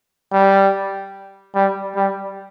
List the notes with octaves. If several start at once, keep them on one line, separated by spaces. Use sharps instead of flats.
G3
G3
G3